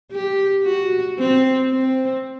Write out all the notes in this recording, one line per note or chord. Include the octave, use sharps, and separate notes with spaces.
G4
F#4
C4
C4